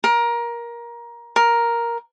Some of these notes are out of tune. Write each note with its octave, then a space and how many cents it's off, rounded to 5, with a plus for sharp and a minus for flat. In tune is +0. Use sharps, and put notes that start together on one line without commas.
A#4 +20
A#4 +5